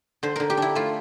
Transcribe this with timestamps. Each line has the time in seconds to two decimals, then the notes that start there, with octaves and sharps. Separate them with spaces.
0.23 D3 C5
0.36 D3 A#4
0.50 G4
0.57 D4 E4
0.75 A3 F4